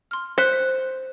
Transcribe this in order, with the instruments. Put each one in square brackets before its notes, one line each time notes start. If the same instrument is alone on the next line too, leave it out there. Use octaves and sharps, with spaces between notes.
[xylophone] C6 F6
[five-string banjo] C5 [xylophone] F#6 B6 C#7